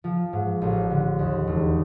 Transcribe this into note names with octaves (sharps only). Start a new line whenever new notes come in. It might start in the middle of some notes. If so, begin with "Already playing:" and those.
F3
G#2
A1
D3
D#2
E1